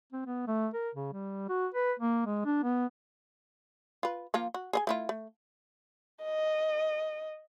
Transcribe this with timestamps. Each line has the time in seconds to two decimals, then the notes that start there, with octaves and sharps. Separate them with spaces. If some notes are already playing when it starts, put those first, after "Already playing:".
0.13 C4
0.26 B3
0.48 A3
0.74 A#4
0.95 C#3
1.13 G3
1.49 F#4
1.74 B4
2.00 A#3
2.26 G#3
2.45 D4
2.63 B3
4.03 F4 B4
4.34 F3 A#3 F4
4.54 F#4
4.73 G#4 D#5 G#5
4.87 A3 E4 F4
5.09 A3
6.24 D#5